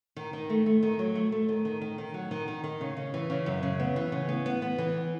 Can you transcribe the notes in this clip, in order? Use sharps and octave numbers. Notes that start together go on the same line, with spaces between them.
D#3
D#3
A3
A3
D#3
F#3
A3
A3
D#3
D#3
D#3
D#3
F#3
D#3
D#3
D#3
C#3
C#3
E3
C#3
F#2
C#3
B3
E3
C#3
B3
B3
B3
E3